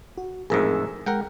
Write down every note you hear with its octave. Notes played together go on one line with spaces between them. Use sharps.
F#4
A1 F2 G#2 G#4 A#4 E6
G#3 A#4 F#5 G5